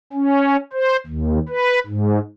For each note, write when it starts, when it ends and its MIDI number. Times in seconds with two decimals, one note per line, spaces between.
0.13 0.57 61
0.73 0.96 72
1.07 1.39 39
1.49 1.80 71
1.87 2.19 44